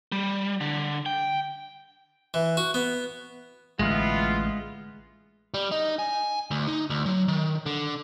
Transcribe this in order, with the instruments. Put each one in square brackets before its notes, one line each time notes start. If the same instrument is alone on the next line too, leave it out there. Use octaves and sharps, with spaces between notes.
[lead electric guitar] G3
D3
G5
[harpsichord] E3
F#4
B3
[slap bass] A1 D3 [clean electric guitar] G#3 [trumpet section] B3 E4 F4
[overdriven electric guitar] G3
D#4
G#5
D2
D#4
D2
F#3
D#3
D3